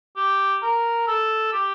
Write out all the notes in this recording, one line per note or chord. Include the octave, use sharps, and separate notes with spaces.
G4
A#4
A4
G4